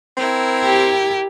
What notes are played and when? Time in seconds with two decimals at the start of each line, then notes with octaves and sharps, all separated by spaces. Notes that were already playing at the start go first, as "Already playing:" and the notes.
0.17 C4 E4 A#4 G#6
0.65 G4